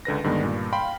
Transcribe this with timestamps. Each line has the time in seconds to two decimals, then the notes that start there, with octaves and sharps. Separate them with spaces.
0.05 C#2 D3 B4 A#6
0.24 G2 D3 D#3 G#3 B3
0.43 G2 A#2
0.73 F5 G5 B5 C6